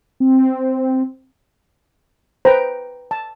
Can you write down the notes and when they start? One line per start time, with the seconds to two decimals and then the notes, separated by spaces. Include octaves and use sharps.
0.20 C4
2.45 B4 C5 G5 A#5
3.11 A5